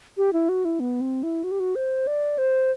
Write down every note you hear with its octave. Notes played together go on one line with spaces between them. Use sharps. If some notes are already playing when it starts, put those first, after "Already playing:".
G4
E4
F#4
E4
B3
C4
E4
F#4
G4
F#4
C5
D5
C5